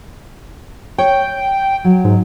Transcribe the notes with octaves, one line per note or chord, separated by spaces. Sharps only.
C#5 G5
F#3
G#2